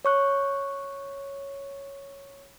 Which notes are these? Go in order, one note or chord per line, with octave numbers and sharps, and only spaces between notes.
C#5 C#6 F#6